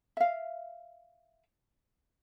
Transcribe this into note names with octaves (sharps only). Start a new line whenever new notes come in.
E5 F5